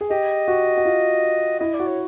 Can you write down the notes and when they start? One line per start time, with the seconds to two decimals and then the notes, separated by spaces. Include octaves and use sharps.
0.01 G#4
0.10 G4 D#5
0.48 F#4
0.78 F#4
0.85 F4
1.60 E4 D#5
1.74 D5
1.80 F#4
1.87 C#5